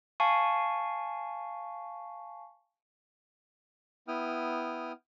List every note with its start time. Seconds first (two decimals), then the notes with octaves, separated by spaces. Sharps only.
0.20 F5 G#5 A5 C#6
4.08 B3 E4 G5 D#6 F6